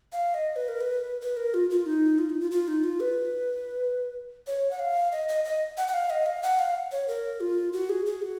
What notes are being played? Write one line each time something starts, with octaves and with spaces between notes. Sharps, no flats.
F5
D#5
B4
A#4
B4
B4
A#4
F4
F4
D#4
F4
D#4
F4
F4
D#4
F4
B4
C#5
F#5
F5
D#5
D#5
D#5
F#5
F#5
F5
D#5
F5
F#5
F5
C#5
A#4
F4
F#4
G#4
G#4
F#4